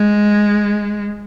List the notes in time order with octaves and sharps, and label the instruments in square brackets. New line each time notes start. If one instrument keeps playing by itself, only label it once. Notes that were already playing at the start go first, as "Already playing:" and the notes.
Already playing: [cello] G#3